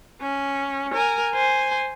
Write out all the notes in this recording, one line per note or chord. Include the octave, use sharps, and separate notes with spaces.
C#4
A#4 G#5
C5 G#5